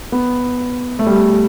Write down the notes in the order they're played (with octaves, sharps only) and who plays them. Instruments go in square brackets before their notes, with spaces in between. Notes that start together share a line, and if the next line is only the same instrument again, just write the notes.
[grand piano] B3
A3
G3
A3